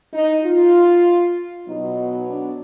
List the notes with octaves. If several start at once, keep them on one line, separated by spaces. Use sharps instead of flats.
D#4
F4
B2 F#3 B3 D#4
D4